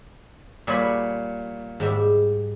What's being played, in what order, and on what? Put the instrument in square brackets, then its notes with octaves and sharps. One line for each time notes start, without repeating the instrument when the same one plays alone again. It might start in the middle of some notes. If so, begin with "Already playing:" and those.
[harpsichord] A#2 C#5 B5 [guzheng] G3 E5 G#5
[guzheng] G#2 G3 E5